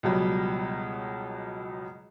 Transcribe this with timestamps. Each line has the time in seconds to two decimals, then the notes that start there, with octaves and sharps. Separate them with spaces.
0.03 C#2 B2 F#3 G3